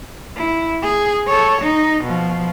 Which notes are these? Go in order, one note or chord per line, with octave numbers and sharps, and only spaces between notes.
E4
G#4
A4 C#5
D#4
B2 F3